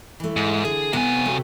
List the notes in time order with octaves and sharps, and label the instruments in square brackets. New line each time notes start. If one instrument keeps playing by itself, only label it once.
[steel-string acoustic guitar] E3 A3
[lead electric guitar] G#2
[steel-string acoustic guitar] D3 [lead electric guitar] G#4
[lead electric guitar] C3 G#5 [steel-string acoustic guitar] B3
[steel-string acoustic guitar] F#3 A3 G4